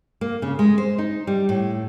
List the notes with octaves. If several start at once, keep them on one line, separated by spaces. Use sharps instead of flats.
A#3
C#3
G#3
C5
D#4
G3
A2